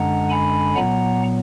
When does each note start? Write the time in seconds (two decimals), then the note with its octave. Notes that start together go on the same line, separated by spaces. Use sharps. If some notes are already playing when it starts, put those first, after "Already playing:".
Already playing: F#2 D3 G#3 D4 F#5 A#5
0.30 G#5 B5
0.75 A#2 F#3 B3 F#5 A#5